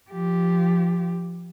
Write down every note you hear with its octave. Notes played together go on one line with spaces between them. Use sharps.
F3 G4